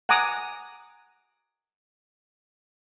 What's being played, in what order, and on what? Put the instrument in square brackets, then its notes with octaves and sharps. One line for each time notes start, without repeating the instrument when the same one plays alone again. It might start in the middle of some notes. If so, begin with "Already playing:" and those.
[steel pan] F#5 G#5 A#5 D6 D#6